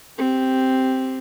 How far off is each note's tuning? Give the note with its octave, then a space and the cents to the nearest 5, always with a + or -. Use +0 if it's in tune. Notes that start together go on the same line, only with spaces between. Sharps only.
C4 +0 G4 +0